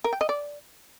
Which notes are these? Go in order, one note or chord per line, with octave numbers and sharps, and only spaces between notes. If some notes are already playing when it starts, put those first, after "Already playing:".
A#4
G5
D#5
D5